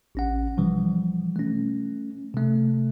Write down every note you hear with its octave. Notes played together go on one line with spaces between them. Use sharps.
A1 C#4 F#5
B2 E3 F3 G3
A3 C#4
C3 A3